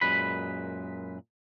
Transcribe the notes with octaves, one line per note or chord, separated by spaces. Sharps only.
F#2 A#2 G#3 B4 B5